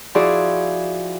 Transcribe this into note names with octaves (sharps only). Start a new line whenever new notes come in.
F3 E4 F#4 G#4 D5